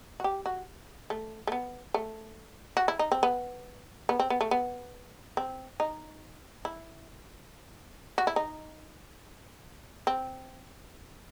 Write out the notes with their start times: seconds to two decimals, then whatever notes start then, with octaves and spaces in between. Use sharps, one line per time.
0.20 F#4
0.24 G4
0.46 F#4
1.10 A3
1.47 A3
1.52 B3
1.94 A3
2.77 F#4
2.88 E4
2.99 D#4
3.12 C4
3.23 B3
4.09 B3
4.19 C4
4.30 B3
4.41 A3
4.51 B3
5.37 C4
5.80 D#4
6.65 E4
8.18 F#4
8.27 E4
8.36 D#4
10.07 C4